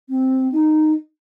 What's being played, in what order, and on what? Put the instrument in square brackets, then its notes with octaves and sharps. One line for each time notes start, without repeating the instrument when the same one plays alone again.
[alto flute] C4
D#4